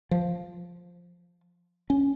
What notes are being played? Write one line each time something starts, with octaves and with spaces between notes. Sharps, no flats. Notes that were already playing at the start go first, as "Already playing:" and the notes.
F3
C#4